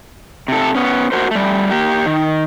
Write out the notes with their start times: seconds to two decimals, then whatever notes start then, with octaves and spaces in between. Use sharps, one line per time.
0.48 C3 A4
0.75 B3 C#4
1.12 F#4 A#4 C5
1.31 G3 A3
1.70 A#3 G4
2.06 D#3